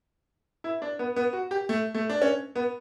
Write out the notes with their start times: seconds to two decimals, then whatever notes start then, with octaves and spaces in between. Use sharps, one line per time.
0.64 E4
0.82 D4
0.99 B3
1.16 B3
1.33 F#4
1.51 G4
1.69 A3
1.94 A3
2.10 D4
2.22 C#4
2.56 B3